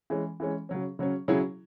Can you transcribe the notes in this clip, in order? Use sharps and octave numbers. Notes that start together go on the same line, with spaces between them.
E3 G#3 C#4
E3 G#3 C#4
C#3 F#3 C#4
C#3 F#3 C#4
C#3 F#3 C#4 E4 G#4